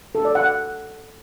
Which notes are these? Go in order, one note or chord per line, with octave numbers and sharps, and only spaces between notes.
A4
D5
F#5